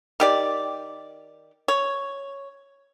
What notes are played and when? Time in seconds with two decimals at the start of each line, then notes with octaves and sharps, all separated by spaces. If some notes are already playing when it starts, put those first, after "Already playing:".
0.20 D#3 G4 D5
1.68 C#5